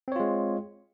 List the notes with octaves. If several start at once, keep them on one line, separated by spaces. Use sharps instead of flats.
G#3 C4 F4 C#5